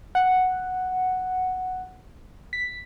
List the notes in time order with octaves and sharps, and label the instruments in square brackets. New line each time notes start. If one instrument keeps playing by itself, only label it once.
[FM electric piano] F#5
B6